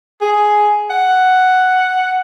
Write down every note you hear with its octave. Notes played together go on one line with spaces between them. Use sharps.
G#4
F#5